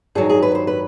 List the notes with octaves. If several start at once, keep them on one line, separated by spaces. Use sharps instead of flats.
G2 D#3 F#3 G#4
G#4
B4
C5
B4